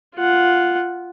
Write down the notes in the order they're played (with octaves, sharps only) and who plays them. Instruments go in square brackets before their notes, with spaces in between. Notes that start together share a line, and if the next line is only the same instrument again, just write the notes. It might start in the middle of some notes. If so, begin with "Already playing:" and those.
[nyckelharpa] F4 F#5